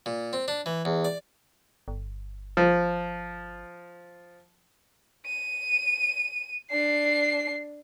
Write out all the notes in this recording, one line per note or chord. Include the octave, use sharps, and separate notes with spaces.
A#2
C4
D4
E3
E2
D5
G1
F3
D#7
D4 C7